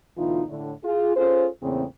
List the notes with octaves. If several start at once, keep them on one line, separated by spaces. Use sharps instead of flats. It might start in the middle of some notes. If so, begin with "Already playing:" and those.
D2 B2 E3 D#4 F4
A2 D3 A3
F4 G#4
C#4 F4 G#4 A4 C5
E2 A#2 C#3 A3 C4 C5